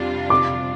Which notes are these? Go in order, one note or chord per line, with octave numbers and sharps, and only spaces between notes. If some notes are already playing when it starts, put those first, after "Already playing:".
Already playing: F2 C3 G3 D4 F4
D6